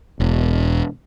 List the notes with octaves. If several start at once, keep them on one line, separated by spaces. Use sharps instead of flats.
E1